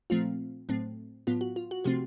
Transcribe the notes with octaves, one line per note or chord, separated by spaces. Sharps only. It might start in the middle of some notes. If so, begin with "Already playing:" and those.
A#2 F3 A3 C4 F4
A2 F#3 A3 C4
A2 F#3 B3 F4
F#4
F4
F#4
C3 F3 A3 C4 G4